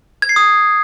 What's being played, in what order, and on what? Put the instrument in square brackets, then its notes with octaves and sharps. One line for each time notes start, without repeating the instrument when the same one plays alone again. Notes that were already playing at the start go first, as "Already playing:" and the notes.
[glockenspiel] G#6
C7
D#6